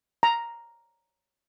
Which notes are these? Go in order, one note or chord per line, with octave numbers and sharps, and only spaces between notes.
A#5